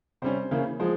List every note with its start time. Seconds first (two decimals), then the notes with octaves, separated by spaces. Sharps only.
0.22 C3 G3 C#4 C5
0.51 C#3 E3 A#3 C#4
0.80 F3 G#3 C5